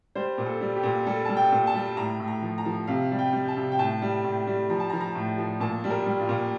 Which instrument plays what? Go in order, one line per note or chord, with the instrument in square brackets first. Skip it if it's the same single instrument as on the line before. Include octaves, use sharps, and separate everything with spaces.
[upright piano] G3 C5
A#2
A4
G3
G4
A#2
G3 A4
G3 A5
G5
A#2
A5
G3
A2 A#5
A2
A#5
F3
A#5
F3
C3 F5
G3
G5
G3
A5
C3
G5
A2 A5
G3
A2
G3
F3 A#5
A5
A#5
F3
A#5
A2
F3
A#2 A5
G3
A#4
G3
F4
A#2